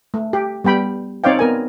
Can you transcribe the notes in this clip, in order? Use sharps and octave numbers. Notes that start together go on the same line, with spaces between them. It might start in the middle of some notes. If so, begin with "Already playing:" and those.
A3
G4
G3 B3 G5 B5
C4 D#4 C#5 D5 F5 G5
B3 A#4 G#5